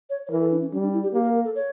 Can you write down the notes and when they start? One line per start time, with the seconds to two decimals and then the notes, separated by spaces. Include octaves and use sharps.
0.10 C#5
0.27 C#5
0.31 E3 A#4
0.41 A4
0.51 D4
0.62 C#4
0.72 G3 C#4
0.83 D4
0.93 E4
1.03 G4
1.13 A#3 G4
1.24 A#4
1.35 A#4
1.44 A4
1.55 C#5